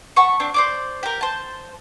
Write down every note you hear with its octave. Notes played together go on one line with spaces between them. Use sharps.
F#5 A5 B5 C#6
C4 D4
C5 D5 D6
G4 A#4
C5 A5